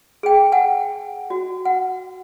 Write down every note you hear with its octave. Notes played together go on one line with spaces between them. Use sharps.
G#4 G5
F#5 G#5
F#4
F#5